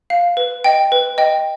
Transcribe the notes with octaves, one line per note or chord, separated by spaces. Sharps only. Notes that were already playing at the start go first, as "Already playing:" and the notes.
F5
B4
D#5 G5
B4
D#5 G5